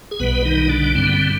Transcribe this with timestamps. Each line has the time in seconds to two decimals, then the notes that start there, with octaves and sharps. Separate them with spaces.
0.11 G#4
0.20 B1 B2 G3 B3 B4
0.45 D#3 D#4
0.69 D3 D4
0.95 G2 D3 G3 C4
1.06 B3
1.14 C4